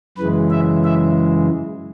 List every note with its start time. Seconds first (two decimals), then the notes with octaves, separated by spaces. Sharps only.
0.17 F#2 C#3 E3 G#3 B4
0.50 E5
0.84 E5